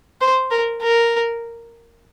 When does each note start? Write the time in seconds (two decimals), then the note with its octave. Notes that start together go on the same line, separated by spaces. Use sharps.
0.21 C5
0.51 A#4
0.82 A#4